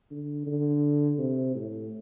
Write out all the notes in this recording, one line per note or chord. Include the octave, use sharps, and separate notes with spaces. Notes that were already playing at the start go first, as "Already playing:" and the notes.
D3
D3
C3
A2